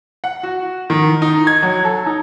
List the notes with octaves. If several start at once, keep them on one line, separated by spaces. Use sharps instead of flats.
F#5
F#4
D#3
D#4
G#6
F#3
A4
D#4